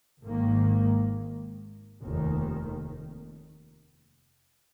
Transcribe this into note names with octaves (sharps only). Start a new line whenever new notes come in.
G#1 G#2 D#3 A#3
F1 D#2 D#3